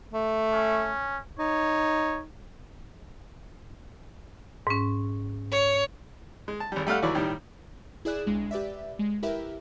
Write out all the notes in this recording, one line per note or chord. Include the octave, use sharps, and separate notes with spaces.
A3
C#4
D#4 C#5
G#2 C#4
C#5
G#3
A5
G#1 G3
G3 A3 A4 F5 F#5
D#2 E3 F#3 D5 B5 C#6
A2 D#3 G3
E4 G#4 D5 F#6 E7
B1 G#3 D4
G4 B4 D5 E5
G#3
E4 G4 A#4 B4 E5